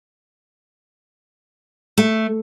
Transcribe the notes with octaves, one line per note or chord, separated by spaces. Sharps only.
A3